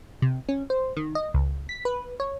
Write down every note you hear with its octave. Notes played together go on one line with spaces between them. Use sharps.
C3
C#4
C5
D#3
D#5
C#2
B6
B4
C#5